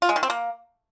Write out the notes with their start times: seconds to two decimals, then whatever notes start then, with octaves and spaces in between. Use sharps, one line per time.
0.02 F4
0.09 G#3
0.16 D#3
0.23 C4
0.30 A#3